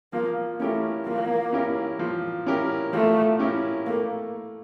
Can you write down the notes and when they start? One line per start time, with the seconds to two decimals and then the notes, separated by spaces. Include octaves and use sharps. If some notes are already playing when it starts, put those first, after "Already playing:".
0.13 F3 A#3
0.60 A3 C#4 E4 G4 A#4
1.06 F3 A#3
1.53 C#4 E4 G4 A#4
1.99 F3
2.46 C#4 E4 G4 A#4
2.93 F3 A3
3.39 C#4 E4 G4 A#4
3.86 A3 A#3